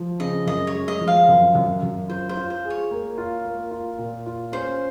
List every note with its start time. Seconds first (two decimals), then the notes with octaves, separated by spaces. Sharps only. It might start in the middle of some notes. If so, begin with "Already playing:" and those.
Already playing: F3
0.20 C#3 D#5
0.46 F#2 D#5
0.67 C#5
0.75 G#3
0.88 D#5
1.01 F3
1.08 F5
1.29 F#2
1.55 F#2
1.83 F#2
2.09 F4 C5
2.29 C5
2.36 F4
2.50 C5
2.64 G#4
2.70 C#5
2.91 A#3
3.18 F4
3.45 A#3
3.71 F4
3.98 A#2
4.26 F4
4.52 C#4 C5